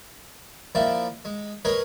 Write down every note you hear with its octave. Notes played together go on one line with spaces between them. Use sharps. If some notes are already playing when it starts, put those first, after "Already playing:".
F3 A#3 E4 D5 E5
G#3
G#4 A#4 B4 C#5 D#5